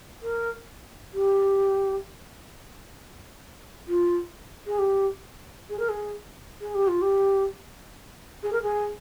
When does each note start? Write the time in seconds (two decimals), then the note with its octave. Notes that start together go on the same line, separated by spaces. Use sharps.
0.22 A#4
1.14 G4
3.88 F4
4.67 G#4
4.79 G4
5.70 G#4
5.79 A#4
5.89 G#4
6.61 G#4
6.75 G4
6.88 F4
7.02 G4
8.43 G#4
8.52 A#4
8.63 G#4